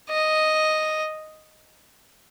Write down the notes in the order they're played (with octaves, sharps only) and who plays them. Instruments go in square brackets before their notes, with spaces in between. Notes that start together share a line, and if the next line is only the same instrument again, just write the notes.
[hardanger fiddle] D#5